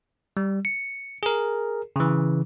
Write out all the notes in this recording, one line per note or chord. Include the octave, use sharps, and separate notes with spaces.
G3
C#7
G#4 A#4
C#3 E3